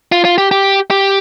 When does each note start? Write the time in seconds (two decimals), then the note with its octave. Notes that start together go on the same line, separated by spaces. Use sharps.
0.12 F4
0.25 F4
0.38 G4
0.51 G4
0.91 G4